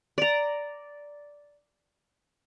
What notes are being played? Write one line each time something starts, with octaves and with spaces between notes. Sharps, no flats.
D5 A#5